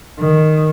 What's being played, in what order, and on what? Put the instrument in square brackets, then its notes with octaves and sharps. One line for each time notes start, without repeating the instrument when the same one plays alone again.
[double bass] D#3